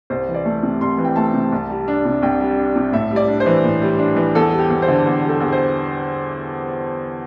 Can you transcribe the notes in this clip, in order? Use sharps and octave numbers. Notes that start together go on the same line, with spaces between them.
C2 C5
E3
D5
A3
C3
C2 C6
E3
G5
A3 A5
C3
C2
G3
D4
C3
C2 G5
G3
D4
C3
A2 E5
G3
D5
D4
C5
E3
A2
G3
D4
E3
E2 A4
G3
G4
E2
C5
D3
E2
G3
A4
E2
C5